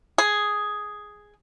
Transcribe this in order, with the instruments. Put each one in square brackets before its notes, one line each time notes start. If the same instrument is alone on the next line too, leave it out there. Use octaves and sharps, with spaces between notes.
[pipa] G#4